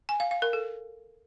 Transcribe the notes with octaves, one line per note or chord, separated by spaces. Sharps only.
G#5
F5
F5
A#4
A4